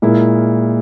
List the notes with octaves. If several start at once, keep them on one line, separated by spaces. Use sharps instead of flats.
A#2 G#3 E4 A#4